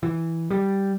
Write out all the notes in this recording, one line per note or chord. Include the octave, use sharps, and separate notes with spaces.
E3
G3